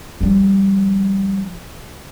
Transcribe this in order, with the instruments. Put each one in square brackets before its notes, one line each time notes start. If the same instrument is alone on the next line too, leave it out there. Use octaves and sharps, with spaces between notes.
[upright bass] F3 G3